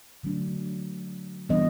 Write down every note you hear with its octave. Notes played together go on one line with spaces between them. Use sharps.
D3 F#3 A3 D4
E3 G3 B3 D4 D#5